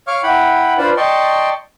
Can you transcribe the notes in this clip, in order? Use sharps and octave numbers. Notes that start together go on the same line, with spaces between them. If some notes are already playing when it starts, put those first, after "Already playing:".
C#5 F5 C#6 D6 F6
E4 F#5 G5 B5
D4 F4 B4 C5 D5
D5 D#5 G5 A5 C6 C#6